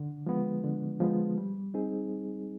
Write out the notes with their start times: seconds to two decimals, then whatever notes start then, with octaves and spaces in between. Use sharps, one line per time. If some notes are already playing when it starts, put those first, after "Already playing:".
Already playing: D3
0.26 F3 G#3 B3
0.64 D3
1.00 F3 G#3 B3
1.38 G3
1.74 C4 D#4 G#4